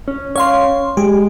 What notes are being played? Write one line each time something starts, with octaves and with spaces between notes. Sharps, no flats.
C#4
C#5 F5 C6
G#3 G4